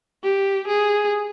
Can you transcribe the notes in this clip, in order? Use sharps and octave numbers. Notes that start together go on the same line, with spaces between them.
G4
G#4